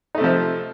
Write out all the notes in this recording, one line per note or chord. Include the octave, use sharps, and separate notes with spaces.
C3 F3 A3 D#4